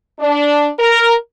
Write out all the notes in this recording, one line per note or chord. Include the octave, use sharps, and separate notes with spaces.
D4
A#4